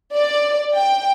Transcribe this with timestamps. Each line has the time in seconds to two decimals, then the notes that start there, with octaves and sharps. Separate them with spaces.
0.15 D5
0.76 G5